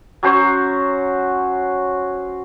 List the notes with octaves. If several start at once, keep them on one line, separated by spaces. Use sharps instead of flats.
F#3 C#4 F#4 C5